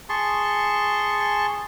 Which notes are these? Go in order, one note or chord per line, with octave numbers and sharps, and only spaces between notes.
G#4 A5 C6 C#6